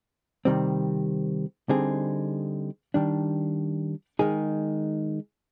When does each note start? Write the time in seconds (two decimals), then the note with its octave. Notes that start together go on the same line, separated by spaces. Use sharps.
0.45 C3 D#3 G3 C4
1.69 D3 G3 C4 D#4 G#4
2.94 D#3 G3 D4
4.19 D#3 G#3 D#4 G#4